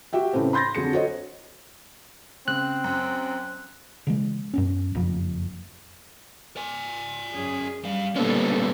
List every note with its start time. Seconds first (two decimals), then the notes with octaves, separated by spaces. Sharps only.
0.13 F#4 G4 E5 G5
0.33 A2 C#3 E3 A3 C4
0.53 B5 C6 G6 A6 A#6
0.75 F2 D3 F#3 G#4 C#7
0.93 F#4 A4 C5 C#5 D#5
2.48 C#3 C4 F#6
2.84 F#2
4.07 C#3 E3 G#3
4.54 F#2 B3 C#4
4.95 F#1 F2
6.57 D5 G#5
7.33 F#2 C#4 G#4
7.83 G2 G3 F5
8.16 A#2 G3 A#3 B3 C#4 D4 A4 C5